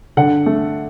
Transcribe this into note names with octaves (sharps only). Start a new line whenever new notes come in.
D3 F#5
A3